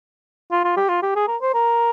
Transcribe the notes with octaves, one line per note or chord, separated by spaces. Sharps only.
F4
F4
G4
F4
G4
G#4
A#4
C5
A#4